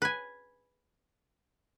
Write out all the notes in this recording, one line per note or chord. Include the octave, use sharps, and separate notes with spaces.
B4 G#5